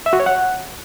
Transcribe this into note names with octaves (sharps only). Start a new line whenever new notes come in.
E5
F#4
C#5
F#5